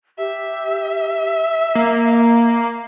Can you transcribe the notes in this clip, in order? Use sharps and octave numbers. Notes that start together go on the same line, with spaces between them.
G4 E5
A#3 A#5